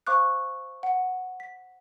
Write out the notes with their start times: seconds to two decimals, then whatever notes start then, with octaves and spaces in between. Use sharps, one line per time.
0.07 C5 F5 C#6 D6 F#6
0.83 F#5
1.40 B6